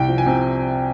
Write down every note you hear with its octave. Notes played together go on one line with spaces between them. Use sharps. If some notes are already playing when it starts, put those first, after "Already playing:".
Already playing: C2 G5
F3
G#5
C3